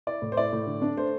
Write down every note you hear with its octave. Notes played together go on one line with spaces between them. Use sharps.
E4 D5
A2
C5
E4 D5
A2
D3
D4
A3 C5